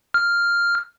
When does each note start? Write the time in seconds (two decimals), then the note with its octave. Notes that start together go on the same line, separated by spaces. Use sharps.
0.14 F6